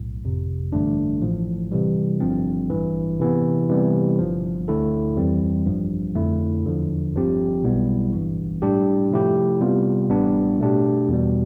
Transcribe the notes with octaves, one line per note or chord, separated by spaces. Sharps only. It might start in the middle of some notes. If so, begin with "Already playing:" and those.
Already playing: B1 A2
G1 F2 C3
A1 G2 D3 A3 D4
A1 A2 F3
C3 E3 G3
G1 G2 F3 C4
A1 G2 E3
C3 E3 B3
C3 E3 G3 B3
G1 G2 F3
D2 D3 A3 E4 A4
F2 E3 G3 C4
A1 G2 F3
F2 D3 A3 E4
E2 D3 F3
G1 G2 F3 C4 G4
B1 B2 G3 B3 E4
G1 G2 E3
A2 G3 D4 G4
C3 F3 A3 E4 G4
C3 G3 B3 F4
A1 A2 G3 B3 D4
B2 A3 D4 G4
E2 B2 G3